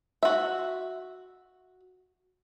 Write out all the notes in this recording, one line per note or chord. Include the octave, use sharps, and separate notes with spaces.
F#4 E5